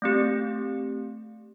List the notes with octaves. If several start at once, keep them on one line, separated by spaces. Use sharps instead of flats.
A3 C4 G4